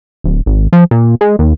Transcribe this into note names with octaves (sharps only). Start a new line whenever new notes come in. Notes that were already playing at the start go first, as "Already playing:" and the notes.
D1
G#1
F3
A#2
G#3
D#2